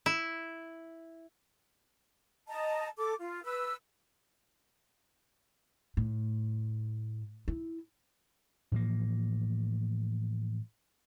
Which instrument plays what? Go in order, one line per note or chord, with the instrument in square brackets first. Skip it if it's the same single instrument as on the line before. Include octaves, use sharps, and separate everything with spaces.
[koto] E4
[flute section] D#5 A5 A#5
A4 D6
F4
B4 E6
[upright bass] A2
E4
[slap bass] A2 E3 F3 A#3